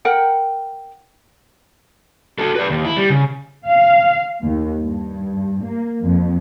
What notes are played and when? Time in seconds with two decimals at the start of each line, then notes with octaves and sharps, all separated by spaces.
0.05 A#4 F#5 G5
2.38 F#4 A4
2.55 B4 D5
2.70 D#2
2.85 E4
2.97 G3
3.10 C#3
3.66 F5
4.42 D#2
4.84 G2
5.62 A#3
6.03 F2